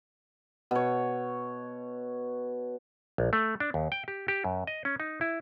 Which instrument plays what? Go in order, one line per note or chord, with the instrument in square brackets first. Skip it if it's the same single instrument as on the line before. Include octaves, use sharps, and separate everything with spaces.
[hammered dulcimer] B2 C#5
[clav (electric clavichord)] A#1
A3
D4
D#2
G5
G4
G4
F#2
D#5
C#4
D#4
E4